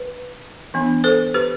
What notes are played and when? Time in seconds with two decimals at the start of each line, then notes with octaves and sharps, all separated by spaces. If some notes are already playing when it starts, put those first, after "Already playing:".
Already playing: B4
0.74 E3 B3 D4
1.04 A4 C5
1.34 G4 B4